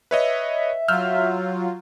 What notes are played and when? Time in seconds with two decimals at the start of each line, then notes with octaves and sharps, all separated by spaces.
0.11 B4 C#5 D#5 E5
0.88 F#3 F4 E6 F6 G6